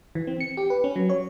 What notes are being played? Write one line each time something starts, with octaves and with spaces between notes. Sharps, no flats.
E3
C4
C#7
G4
B4
C#4
F#3
C#5